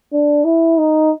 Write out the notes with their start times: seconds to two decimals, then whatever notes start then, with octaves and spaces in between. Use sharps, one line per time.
0.13 D4
0.45 E4
0.78 D#4